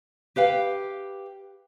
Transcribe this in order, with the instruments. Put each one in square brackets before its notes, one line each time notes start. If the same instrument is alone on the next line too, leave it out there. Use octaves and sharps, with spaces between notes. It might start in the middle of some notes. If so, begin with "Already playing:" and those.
[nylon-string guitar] G4 B4 F5 G5